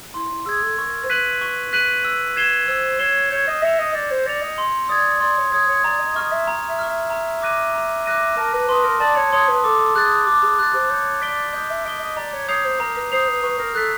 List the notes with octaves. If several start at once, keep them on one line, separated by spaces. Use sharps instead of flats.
E4 C6
E4
G#4 E6 G#6
A4
A#4 C#6
C5
B4 F#6 B6 D#7 F#7
C#6
F#6 B6 D#7 F#7
E6
G#6 C7 E7 G7
C5 E6
C#5 G#6 C7 E7 G7
C#5 G6
D#5
E5 A#6 C#7 F7
D#5
D5 G6
C5
D5 A#6 C#7 F7
D#5
C6
D5 D#6 G#6
D5 C6
C#5
C#5 D#6 G#6
C#5
D5 A#5
D#5
D#5 C#6 F6
E5
A#5
E5
C#6 F6
E5
A#5
D6 F#6 A#6 D#7
A#5
D6 F#6 A#6 D#7
A#4 A5
B4
B4 C6 D#6
A#4
D5 A5
C#5
C#5 C6 D#6
B4
A4 D6
G#4 F#6 A6
G4 D6
G#4
G4 F#6 A6
C5
C#5 G6
D5 B6 D7 G7
D#5 G6
E5
D#5 B6 D7 G7
D#5
D5 A#5
C#5
C#5 D#6 G6 C7 F7
C5
A#4 A#5
B4
C5 D#6 G6 C7 F7
B4
B4 C#6
A#4
A4 F#6 B6